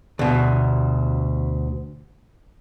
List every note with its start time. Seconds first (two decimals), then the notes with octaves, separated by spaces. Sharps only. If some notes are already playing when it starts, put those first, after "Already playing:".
0.19 D2 B2